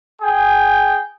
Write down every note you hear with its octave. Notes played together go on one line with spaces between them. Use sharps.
G#4 G5